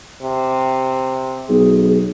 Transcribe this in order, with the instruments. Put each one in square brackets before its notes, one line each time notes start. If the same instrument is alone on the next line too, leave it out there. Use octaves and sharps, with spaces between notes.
[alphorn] C3
[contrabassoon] B1 [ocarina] G#4